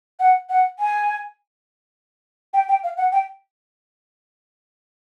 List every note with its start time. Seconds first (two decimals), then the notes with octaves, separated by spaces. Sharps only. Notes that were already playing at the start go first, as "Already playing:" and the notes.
0.20 F#5
0.50 F#5
0.79 G#5
2.54 G5
2.69 G5
2.84 F5
2.97 F#5
3.12 G5